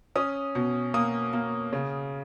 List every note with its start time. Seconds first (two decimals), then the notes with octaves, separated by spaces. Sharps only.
0.16 C#4 D#6
0.55 B2
0.94 A#3 D#6
1.33 A#3
1.73 C#3